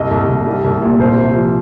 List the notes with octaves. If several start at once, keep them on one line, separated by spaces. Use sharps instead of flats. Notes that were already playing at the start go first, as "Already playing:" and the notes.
Already playing: C2 D#5
C2
C2
G3
C2
A#2
C2 C5
C3
F3